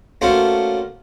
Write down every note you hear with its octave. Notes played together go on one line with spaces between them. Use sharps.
A3 A#3 C#4 F4 F#4 C5